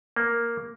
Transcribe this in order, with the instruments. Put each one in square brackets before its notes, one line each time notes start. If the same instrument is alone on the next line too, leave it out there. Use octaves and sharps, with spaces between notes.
[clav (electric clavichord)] A#3